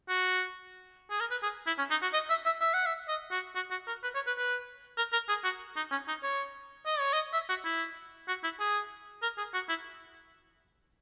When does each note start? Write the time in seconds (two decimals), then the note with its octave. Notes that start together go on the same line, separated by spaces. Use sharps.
0.09 F#4
1.11 G#4
1.20 A#4
1.31 B4
1.43 G#4
1.67 E4
1.78 C#4
1.91 D#4
2.02 F#4
2.13 D#5
2.30 E5
2.46 E5
2.61 E5
2.74 F#5
2.86 E5
3.08 D#5
3.31 F#4
3.56 F#4
3.71 F#4
3.88 A#4
4.03 B4
4.15 C#5
4.27 B4
4.38 B4
4.97 A#4
5.12 A#4
5.29 G#4
5.44 F#4
5.76 D#4
5.91 C#4
6.08 D#4
6.23 C#5
6.86 D#5
7.00 C#5
7.13 D#5
7.33 E5
7.49 F#4
7.65 E4
8.28 F#4
8.44 E4
8.60 G#4
9.22 A#4
9.38 G#4
9.54 F#4
9.69 E4